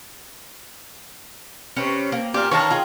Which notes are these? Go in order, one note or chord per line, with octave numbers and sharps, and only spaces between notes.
C3 C#4 B4
A#3
A#2 G4 F5
D#3 C#4 C#5 F5 A5 A#5
F4 G#4